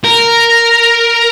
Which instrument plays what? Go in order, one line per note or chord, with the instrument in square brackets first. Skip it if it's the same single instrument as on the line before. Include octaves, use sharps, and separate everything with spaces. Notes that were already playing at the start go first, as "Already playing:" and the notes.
[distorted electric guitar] A#4